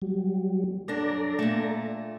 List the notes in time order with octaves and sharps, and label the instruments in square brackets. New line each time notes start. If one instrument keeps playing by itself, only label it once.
[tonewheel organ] F#3 G3
[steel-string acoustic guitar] F#2 D4 [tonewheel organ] A4 D5 A#5
[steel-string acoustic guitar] A#2 A3